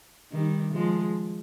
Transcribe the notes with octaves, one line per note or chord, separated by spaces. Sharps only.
D#3 G3
F3 G#3